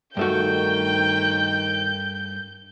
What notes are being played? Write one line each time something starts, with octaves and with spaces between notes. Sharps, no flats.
G2 D#3 A3 F#4 G5 G6